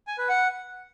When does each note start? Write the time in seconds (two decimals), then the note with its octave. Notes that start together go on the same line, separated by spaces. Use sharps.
0.07 G#5
0.18 B4
0.29 F#5